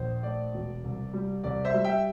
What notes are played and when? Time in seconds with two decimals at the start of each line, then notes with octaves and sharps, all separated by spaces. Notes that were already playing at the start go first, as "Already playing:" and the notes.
Already playing: A#1 C5
0.23 A3 D5
0.54 E1
0.84 C2
1.14 G3
1.44 C2 D5
1.65 C5 E5
1.74 G3
1.84 E5 G5